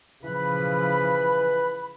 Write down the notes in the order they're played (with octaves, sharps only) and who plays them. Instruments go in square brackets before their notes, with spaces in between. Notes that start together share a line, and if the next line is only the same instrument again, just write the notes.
[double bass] C#3 F3 [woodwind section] E3 B4 B5